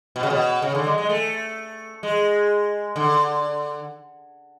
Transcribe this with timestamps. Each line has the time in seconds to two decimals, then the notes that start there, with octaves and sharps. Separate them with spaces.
0.16 B2
0.23 C#3
0.30 B2
0.62 C#3
0.75 D3
0.86 G#3
0.98 G#3
1.09 A3
2.03 G#3
2.96 D3